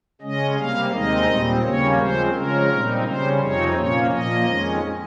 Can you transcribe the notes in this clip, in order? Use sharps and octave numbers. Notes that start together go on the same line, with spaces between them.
C#3 G#3 C#4 D#5
C3 G3 A#3 F5
D#2 D#3 G#3 C4 D#4 D#5
A#2 G3 C4
D#2 C#3 G3 A#3 C#4 C#5
C#3 F3 G#3 C4 C5
C#3 F3 G#3 C#4 A#4
A#2 G3 C4 D#4
C#3 G3 C#4 C5
F2 C3 F3 C4 D#4 C#5
A#2 F3 A#3 C#4 C#5
A#2 F3 A#3 D#5
F2 D#3 G#3 C#4